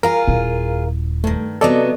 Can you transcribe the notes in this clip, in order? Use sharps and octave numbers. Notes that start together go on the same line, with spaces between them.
F4 G#4 A#4 F5 A#5
D#1 E4
G2 D#3 A3
C3 F#3 B3 A4 D5 D#5